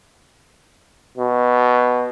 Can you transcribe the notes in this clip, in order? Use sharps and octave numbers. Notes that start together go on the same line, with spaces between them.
B2